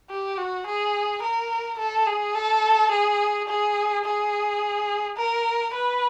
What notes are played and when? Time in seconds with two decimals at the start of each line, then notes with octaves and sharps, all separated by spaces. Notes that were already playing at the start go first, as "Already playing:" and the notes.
0.10 G4
0.38 F#4
0.67 G#4
1.23 A#4
1.79 A4
2.07 G#4
2.35 A4
2.91 G#4
3.48 G#4
4.05 G#4
5.17 A#4
5.74 B4